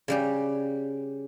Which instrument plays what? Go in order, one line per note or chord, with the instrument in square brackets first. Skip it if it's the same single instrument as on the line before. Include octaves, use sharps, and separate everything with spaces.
[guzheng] C#3 G3 G4